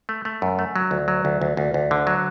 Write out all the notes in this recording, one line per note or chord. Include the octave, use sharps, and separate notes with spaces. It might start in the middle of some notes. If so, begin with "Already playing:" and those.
A3
A3
F#2
A3
F#3
D2
F#3
D2
D2
D2
D2
D3
F#3